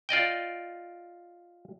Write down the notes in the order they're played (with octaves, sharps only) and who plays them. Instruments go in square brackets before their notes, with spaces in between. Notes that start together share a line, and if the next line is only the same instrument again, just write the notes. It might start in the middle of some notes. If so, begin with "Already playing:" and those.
[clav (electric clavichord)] F4 D5 D#5 G5